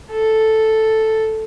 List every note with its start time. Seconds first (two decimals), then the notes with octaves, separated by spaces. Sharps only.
0.11 A4